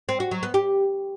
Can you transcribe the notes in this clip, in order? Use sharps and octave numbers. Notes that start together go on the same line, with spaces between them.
C4
F#4
F#3
B3
G4